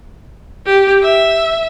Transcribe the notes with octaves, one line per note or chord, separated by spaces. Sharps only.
G4
E5